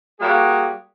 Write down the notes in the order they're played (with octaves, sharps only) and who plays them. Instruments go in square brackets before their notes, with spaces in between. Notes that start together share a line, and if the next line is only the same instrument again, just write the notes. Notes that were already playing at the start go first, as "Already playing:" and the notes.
[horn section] G3 A#3 F#4 G#4